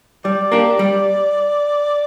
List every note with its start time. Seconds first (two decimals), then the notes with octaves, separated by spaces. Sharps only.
0.24 G3 D5
0.52 A#3 D4 G4
0.79 G3